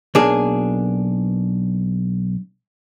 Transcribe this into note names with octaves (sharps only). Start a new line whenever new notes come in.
B1 A#3 D4 G#4